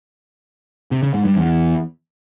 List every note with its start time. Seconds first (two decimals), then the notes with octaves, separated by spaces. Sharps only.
0.91 C3
1.03 C#3
1.14 G#2
1.25 G2
1.36 E2